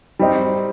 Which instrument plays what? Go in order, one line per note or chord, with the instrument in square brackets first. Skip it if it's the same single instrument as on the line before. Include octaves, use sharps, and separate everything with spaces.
[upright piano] G3 C4 D#4